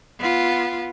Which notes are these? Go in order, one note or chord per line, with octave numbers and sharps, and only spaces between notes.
B3 F4